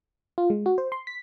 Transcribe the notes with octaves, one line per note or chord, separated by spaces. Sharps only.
F4
G#3
F#4
C5
C6
B6